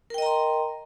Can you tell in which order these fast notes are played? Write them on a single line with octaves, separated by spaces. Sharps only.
A#4 G5 D#5 A#5 C6